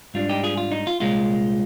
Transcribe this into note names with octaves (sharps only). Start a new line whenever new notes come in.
G#2 G3 D4 F4
D#4 G4
F4 G#4
F4
D#4
F4
C2 A#2 G#3 F4